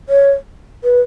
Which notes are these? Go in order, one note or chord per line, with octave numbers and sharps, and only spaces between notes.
C#5
B4